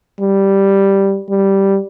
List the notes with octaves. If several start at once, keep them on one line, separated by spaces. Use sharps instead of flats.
G3
G3